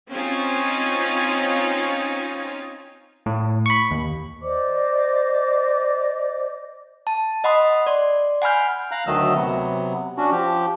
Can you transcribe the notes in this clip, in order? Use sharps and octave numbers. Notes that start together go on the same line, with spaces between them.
C4 C#4 D#4 F4 C#5
A2
B5 C#6
D#2
C5 D5 D#5 D6
A5
D#5 F#5 B5 C6 D#6
D5 C6
F#5 G#5 B5 F6 G6
F5 A#5 F#6
D2 D#3 F#3 A3 D#5 E6
C3 F#3 B3
C#4 D4 F#4
F3 G4